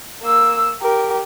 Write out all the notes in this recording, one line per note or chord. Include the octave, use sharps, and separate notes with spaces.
A#3 E6
G4 A#4